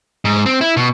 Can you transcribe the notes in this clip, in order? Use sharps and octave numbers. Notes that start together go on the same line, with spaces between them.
G#2
C4
E4
B2